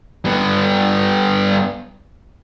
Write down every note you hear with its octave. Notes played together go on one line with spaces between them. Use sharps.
G2 B3